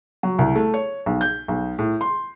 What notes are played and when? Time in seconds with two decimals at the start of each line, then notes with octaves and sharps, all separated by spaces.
0.23 F#3
0.39 C2
0.55 A3
0.74 C#5
1.06 B1
1.21 G6
1.48 B1
1.79 A2
2.01 C6